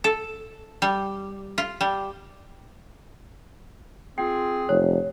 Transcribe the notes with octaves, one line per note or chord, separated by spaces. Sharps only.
A4
G3
F4
G3
C4 F4 G#4 G5
F1 C#5